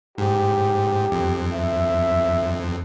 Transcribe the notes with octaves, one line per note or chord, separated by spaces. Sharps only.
G#2 G4
F2
E5